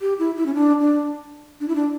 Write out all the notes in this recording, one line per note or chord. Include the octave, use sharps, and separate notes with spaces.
G4
E4
E4
C#4
D4
D4
D4
E4
D4